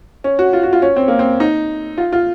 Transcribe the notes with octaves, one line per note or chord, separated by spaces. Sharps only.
C#4
F#4
F4
F#4
F4
C#4
C4
A#3
C4
D#4
F4
F4